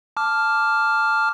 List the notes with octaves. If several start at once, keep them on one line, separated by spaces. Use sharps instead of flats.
A5 D6 F6